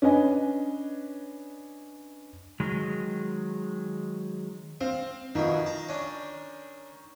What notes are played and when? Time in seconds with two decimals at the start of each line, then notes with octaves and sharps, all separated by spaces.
0.02 C#4 D4 B4 D#5 G#5
2.60 D#3 F#3 G#3
4.81 C4 F5
5.35 F2 B2 D#3 E4
5.66 A5 A#5
5.89 C#4 D4